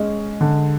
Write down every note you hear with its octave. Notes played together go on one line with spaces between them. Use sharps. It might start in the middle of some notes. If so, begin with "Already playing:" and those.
Already playing: G#3 C#4
D3